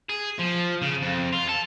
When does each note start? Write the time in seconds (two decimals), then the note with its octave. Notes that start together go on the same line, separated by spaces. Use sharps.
0.09 G#4
0.39 F3
0.82 C#3
1.02 F2
1.33 F4
1.49 A4